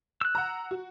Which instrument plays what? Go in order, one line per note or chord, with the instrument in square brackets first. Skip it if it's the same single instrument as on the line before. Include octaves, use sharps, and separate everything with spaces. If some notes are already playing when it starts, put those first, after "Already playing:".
[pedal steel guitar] E6 F#6
[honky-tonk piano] F#5 A#5
F#4